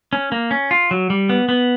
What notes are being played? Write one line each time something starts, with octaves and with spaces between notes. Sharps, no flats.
C#4
A#3
C#4
F4
F#3
G3
B3
B3